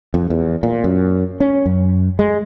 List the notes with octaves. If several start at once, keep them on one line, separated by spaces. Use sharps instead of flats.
F2
E2
A#2
F#2
C#4
F#2
G#3